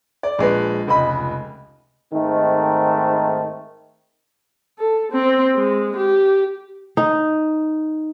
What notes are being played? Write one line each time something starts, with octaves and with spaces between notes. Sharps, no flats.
D5
A#1 G#3 B4
F1 C#2 D#5 B5
G#2 D#3 A3 C4 D#4
A4
C4
G#3
G4
D#4